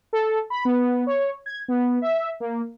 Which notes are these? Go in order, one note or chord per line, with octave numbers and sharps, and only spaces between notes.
A4
B5
B3
C#5
G#6
B3
E5
A#3